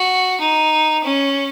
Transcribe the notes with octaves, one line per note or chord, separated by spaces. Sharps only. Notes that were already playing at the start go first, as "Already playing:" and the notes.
Already playing: F#4
D#4
C#4